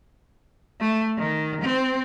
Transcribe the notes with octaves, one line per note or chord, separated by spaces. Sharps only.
A3
D#3
C4